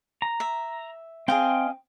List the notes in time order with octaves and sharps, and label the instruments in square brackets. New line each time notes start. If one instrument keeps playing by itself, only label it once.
[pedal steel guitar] A#5
[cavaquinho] E5
[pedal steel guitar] C4 G5 [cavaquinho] G#4 D#5 F5